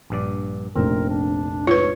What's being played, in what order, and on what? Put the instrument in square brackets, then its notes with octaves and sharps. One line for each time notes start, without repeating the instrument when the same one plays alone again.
[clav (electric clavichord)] A#1 G2 D5
[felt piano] F1 A#1 [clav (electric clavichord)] C4 [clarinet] A#4
[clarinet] D4
[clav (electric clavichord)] G#2 [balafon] F4 B4 [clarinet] C#5